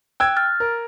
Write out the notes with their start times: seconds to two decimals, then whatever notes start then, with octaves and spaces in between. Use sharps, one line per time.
0.20 G5 E6 F#6 G#6
0.37 F6 A6
0.60 A#4